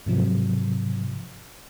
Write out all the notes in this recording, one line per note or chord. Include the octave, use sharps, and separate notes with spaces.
G#2 C3 F3 F#3